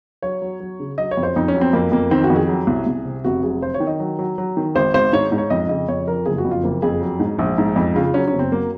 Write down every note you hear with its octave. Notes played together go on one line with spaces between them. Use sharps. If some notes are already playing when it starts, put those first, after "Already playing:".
F#3 C#5
F#3
F#3
C#3
F#3 D#5
C#5
F2
C5
F2 D#4
C#4
F#3
C4
F2 A#3
F2 A#3
D#3 C4
F#4
F2
G#4
F#3
C2
C2
C3
F1 F#4
F#3 G#4
F#3 C5
C#5
D#3
D#5
F#3
F#3
F#3
D#3
G#1 C5
G#1 C5
G#2 C#5
G#2
C#5
F2 D#5
C#3 D#5
F2 C#5
F3 A#4
F#1 G#4
F#4
F2
F4
F#1 A#3
F2 G#4
F#3
G#2
A#1
G#2
F2
C#3 F4
F#3 C#4
C#4
F#1
C4
F#3 A#3